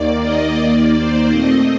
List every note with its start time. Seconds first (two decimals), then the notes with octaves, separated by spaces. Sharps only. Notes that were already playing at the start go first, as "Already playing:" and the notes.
Already playing: D#2 D#3 A#3 D5
0.21 D#5
0.56 D#2 D#3 A#3 D5
0.93 C5
1.29 A#2 A3 C4 D#5